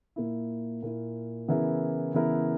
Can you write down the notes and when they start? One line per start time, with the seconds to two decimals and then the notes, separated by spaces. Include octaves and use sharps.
0.16 A#2 A#3 E4
0.83 A#2 A#3 E4
1.48 C#3 E3 B3 E4 A#4
2.14 C#3 E3 B3 E4 A#4